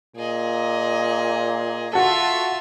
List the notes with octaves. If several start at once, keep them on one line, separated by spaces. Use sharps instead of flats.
A#2 G#4 D#5
F4 F#4 A4 E5